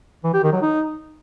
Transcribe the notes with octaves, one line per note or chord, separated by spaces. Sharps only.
E3
G4
D#3
F#3
D#4